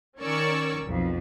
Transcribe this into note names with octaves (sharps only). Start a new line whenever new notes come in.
D#3 C#4 A#4 D5 C#6 E6
B1 F2